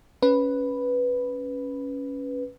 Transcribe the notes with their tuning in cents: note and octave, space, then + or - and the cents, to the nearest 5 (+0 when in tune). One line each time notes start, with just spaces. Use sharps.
C#4 +0 B4 +0